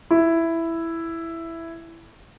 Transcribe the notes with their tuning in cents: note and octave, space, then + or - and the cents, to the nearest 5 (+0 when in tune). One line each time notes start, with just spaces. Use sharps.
E4 +5